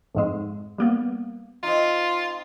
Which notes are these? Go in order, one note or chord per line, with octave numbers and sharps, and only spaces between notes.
F2 G#2 G#3
G3 A#3 B3
C4 D#4 F4